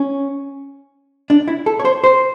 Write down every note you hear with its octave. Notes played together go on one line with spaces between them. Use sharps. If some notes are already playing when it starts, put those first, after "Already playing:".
Already playing: C#4
D4
E4
A4
C#5
C5
C5